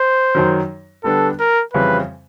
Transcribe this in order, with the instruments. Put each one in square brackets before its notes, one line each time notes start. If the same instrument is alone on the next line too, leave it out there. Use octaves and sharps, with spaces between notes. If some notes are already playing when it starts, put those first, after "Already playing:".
Already playing: [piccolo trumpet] C5
[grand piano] F#2 D#3 F#3
[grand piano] D3 G3 B3 D4 [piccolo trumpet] A4
[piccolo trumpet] A#4
[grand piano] F2 C#3 E3 G3 C4 [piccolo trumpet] B4